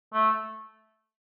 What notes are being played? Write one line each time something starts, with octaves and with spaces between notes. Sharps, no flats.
A3